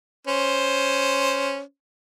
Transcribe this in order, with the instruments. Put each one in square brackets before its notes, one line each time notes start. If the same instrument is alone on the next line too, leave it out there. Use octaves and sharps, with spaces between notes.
[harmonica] C#4 C5